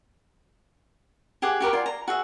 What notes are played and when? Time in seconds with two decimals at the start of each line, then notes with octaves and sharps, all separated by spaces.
1.42 G4 G#4 F#5 D6
1.60 F#4 G4 A#4 A#5
1.73 F4 D5 G#5
1.86 A#5
2.08 F#4 G#4 E5